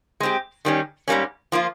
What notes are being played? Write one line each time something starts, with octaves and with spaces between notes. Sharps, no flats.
G#3 C4 G4
D#3 G3 A#3 C#4
G#2 G3 A#3 C#4
F3 A#3 F4